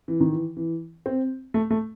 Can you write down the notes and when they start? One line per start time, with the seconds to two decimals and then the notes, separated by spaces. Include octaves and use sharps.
0.08 E3
0.20 D#3
0.33 E3
0.57 E3
1.06 C4
1.54 A3
1.70 A3